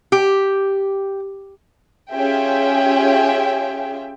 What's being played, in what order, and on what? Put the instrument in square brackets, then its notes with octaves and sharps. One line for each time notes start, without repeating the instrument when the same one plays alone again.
[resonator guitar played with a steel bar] G4
[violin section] C#4 F4 G4 G#4 E5 G5